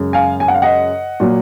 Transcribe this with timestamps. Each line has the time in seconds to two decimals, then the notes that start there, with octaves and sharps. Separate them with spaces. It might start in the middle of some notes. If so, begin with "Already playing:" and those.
Already playing: F#2 C#3 G#3
0.13 F5 G#5
0.40 G#5
0.48 F#5
0.54 F5
0.62 D#5 F#5
1.20 A#2 F#3